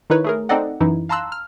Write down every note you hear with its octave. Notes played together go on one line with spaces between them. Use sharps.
D#3 D#4 E4 B4 C#5
A3 G#4 A#4
C4 D#4 A4 D5 D#5 F#5
F#2 E3 D#4 E4
F5 A5 A#5 C6 E6 F#6
F6